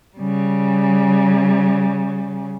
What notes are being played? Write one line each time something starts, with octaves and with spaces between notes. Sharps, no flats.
C#3 G3